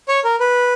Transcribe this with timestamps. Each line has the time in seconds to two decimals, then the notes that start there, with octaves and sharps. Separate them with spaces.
0.08 C#5
0.24 A#4
0.40 B4